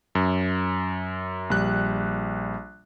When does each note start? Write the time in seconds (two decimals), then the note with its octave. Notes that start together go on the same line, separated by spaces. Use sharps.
0.15 F#2
1.50 A#1 G3 F#6